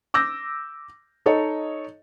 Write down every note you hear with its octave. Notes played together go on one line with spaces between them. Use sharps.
D6 E6 G6 A#6
D#4 A4 C#5 D#5